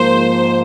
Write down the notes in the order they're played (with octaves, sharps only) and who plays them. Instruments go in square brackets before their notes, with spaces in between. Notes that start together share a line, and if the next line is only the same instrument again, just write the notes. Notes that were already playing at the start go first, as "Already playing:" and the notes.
Already playing: [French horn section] G#2 F3 A#3 [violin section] C5